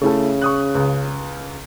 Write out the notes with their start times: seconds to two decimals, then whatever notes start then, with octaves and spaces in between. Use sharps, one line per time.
0.02 C#3 A3 E4 A4
0.41 C#6 D#6 F#6
0.75 C#2